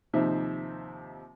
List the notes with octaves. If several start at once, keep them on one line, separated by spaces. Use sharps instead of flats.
D#2 C3 F3 D#4 C5 E5